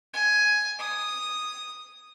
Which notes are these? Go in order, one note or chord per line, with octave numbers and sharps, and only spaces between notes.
G#5
D#6